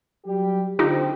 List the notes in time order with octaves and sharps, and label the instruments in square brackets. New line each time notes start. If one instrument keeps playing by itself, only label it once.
[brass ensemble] F#3 G3 G4
[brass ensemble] D3 C4 [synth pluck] D#4 F4 G4